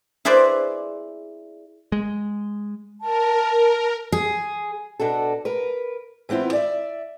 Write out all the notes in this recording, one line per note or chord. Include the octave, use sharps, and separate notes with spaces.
E4 G#4 B4 C5 D5
G#3
A#4 A5
G#4
B2 D4 F#4 A4
A#4 B4
E3 B3 C4 E4 F4
D5 E5